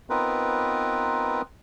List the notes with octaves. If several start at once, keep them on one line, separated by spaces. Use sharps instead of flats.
B3 C4 D#4 F4 A#4 B4